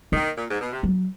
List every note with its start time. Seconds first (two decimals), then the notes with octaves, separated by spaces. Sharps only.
0.12 D#3 A#3
0.36 A#2
0.49 G#2
0.60 B2
0.72 C3
0.83 F#3